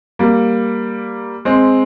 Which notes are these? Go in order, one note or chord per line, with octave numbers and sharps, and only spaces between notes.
G3 A#3
G#3 C4